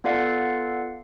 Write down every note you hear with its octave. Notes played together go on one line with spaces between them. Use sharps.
B3 F4 A4 D5 F5 F#5